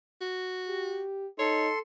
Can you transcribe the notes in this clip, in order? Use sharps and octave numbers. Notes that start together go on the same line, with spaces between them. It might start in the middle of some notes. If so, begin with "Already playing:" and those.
F#4
G4
D#4 A4 C#5 C6